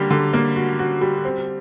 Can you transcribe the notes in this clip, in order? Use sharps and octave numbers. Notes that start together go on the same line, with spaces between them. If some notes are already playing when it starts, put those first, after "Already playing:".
Already playing: D3 G3 A#3
D3
A#3
F#4
F#4
G3
C4